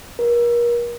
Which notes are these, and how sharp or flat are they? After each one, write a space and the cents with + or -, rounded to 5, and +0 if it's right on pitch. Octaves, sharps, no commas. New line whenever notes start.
A#4 +35